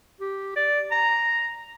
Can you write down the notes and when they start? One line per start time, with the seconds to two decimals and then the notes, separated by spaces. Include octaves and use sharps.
0.21 G4
0.56 D5
0.91 A#5